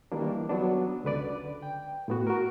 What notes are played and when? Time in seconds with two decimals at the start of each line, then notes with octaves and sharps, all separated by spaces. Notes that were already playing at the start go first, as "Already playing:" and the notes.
0.12 D#3 E3 G3 A#3 D4
0.49 F#3 B3 D4
1.04 C#2 D3 B4 D5
1.62 G5
2.08 A2 B3 F#4
2.27 F#4 A#4